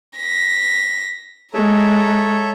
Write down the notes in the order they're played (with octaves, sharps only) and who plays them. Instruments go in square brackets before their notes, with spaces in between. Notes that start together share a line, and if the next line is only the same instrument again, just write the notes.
[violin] A#6 B6
[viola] G#3 [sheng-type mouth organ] A4 C#5 E5 [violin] A#5